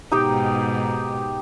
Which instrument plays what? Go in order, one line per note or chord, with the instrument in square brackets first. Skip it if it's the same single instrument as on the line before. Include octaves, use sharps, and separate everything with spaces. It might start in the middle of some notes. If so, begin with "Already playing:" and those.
[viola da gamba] G#2 B2 [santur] D#4 G4 G5